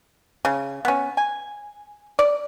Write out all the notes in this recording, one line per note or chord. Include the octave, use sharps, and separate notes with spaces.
C#3
B3 C#4
G#5
D5